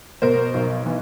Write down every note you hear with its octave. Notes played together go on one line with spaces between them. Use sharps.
B2 A#4 C5
B1
E3